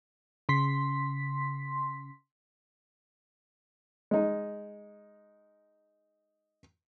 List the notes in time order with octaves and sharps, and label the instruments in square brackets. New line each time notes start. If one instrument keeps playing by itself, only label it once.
[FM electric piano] C#3 C6 B6
[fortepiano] G#3 D#4